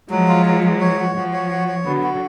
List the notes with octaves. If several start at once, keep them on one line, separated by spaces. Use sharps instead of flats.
F3 F#3 G#3
F4
F#3
F#3
C#5
F#4
F3 F#4
C#5
F#4
C#5
D3 F#3 B3
F#4